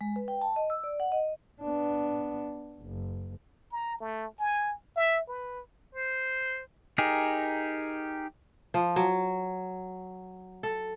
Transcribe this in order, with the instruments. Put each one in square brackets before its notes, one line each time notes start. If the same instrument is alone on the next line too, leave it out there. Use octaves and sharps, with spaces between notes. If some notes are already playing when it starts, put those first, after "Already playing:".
[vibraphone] G#3
B4
G5
A5
D#5
E6
D5
F#5
D#5
[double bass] B3 D4
F#1
[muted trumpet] A#5
A3
G#5
E5
B4
[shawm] C5
[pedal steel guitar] D#4 G4 G#4 A#4
[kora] F3
F#3
A4